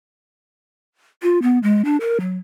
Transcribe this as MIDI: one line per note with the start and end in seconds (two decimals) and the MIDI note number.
1.22 1.39 65
1.42 1.59 59
1.63 1.84 56
1.85 1.97 62
2.00 2.18 70
2.20 2.38 54